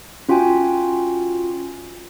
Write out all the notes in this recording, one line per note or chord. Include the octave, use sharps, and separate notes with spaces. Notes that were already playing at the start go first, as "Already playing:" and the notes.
C#4 F4 F#4 G5 G#5